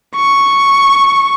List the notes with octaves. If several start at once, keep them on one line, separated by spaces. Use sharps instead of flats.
C#6